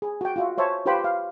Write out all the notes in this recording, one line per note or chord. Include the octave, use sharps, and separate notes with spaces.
G#4
F#4 G5
F4 F#4 E5
C5 C#5 E5 G5 A5
F4 G4 B4 C5 G5 B5
F5